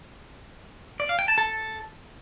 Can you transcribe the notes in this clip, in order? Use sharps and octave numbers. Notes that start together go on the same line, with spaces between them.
D5
F5
G5
A5
A4